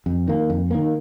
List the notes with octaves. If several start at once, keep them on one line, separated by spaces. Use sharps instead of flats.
F2
D#3 A#3
F2
D#3 A#3